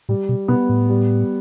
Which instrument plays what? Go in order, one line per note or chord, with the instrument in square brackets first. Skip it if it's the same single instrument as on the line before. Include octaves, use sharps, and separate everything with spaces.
[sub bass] A2 [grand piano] G3
[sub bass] B2
[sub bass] B2 [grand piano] B3
[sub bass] A2
[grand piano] G3